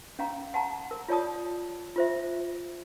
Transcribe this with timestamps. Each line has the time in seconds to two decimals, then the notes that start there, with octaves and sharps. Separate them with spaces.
0.19 C#4 F5 A#5
0.54 F#5 A5 A#5
0.91 A#4
1.08 F4 C#5 D5 A5 D#6
1.96 F4 C5 E5